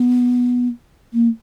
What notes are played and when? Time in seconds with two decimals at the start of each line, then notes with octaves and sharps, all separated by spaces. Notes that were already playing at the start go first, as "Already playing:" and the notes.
Already playing: B3
1.13 A#3